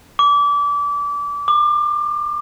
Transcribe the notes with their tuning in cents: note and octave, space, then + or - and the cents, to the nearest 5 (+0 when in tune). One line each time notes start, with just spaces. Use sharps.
D6 -25
D6 +30